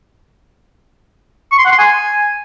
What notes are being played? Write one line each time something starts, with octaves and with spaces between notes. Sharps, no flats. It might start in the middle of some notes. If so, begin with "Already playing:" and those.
C#6
C6
F#5
C6
G#5